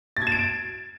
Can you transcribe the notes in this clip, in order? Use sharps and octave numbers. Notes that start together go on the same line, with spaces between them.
A6
G#6
E7
D7